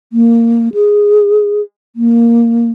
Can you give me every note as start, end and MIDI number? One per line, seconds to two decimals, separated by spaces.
0.13 0.69 58
0.74 1.61 68
1.96 2.71 58